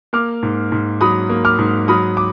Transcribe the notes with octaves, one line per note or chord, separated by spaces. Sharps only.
A#3 D6 F6
G#2
G#2
F#3 B5 D#6
A#3
D6 F6
G#2
F#3 B5 D#6
D6